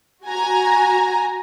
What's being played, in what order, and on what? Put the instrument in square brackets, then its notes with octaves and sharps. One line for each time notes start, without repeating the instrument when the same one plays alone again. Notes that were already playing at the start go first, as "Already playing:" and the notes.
[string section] F#4 G#5 A#5